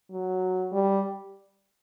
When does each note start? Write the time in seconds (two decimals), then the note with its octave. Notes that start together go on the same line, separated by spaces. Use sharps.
0.11 F#3
0.72 G3